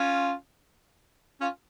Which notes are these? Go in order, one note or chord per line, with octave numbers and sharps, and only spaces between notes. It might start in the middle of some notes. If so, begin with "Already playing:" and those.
Already playing: C#4 F4
C#4 F4